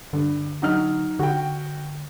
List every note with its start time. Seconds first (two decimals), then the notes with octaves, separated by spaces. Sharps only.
0.13 G2 D3
0.62 F#3 D#4 F6
1.19 D3 F#4 G5